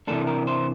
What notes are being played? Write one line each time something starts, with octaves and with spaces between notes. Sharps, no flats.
C3 E3 A#3 D4 A4
A#4
C5